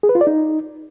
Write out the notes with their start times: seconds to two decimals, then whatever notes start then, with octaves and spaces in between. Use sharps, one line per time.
0.03 G#4
0.09 B4
0.15 F4
0.21 D5
0.27 D#4